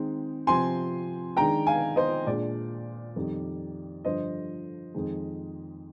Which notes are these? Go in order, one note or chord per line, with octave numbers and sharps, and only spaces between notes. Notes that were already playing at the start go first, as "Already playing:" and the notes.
Already playing: D#3 G#3 C4 D#4
C3 F3 C4 G#5 C6
D#3 G#3 D4 G5 A#5
F5 G#5
C5 D#5
A#2 G#3 D4 D5
F2 D#3 G3
G2 D3 F3 C5 D#5
F2 D#3 G#3